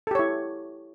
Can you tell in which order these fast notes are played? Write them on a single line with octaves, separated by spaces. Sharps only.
A4 G4 C#5 E4